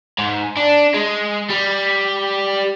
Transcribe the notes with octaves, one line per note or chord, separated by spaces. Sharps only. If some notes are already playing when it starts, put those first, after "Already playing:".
G#2
D4
G#3
G3